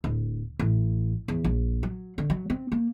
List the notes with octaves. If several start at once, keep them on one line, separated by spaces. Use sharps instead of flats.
D1
A1
E2
A#1
F#3
D3
F#3
C4
A#3